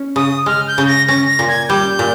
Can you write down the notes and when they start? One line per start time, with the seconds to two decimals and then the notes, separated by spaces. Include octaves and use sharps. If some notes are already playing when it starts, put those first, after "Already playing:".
Already playing: C#4
0.16 C#3 D#6
0.46 G#3 F6
0.68 G6
0.78 C#3
0.88 A#6
1.08 C#4 A#6
1.28 A#6
1.39 A#2
1.49 G#6
1.69 G3 G6
1.99 A#2